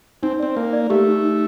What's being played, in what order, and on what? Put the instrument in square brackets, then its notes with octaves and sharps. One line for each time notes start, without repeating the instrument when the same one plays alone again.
[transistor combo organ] C4 [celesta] D#4
[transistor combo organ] C4 [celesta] D5
[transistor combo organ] A#3 [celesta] D#4
[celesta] D5
[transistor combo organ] A3 [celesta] G4
[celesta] D#4
D#4